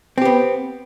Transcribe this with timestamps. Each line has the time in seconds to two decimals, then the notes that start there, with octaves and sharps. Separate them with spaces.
0.18 C4
0.21 G4
0.25 B3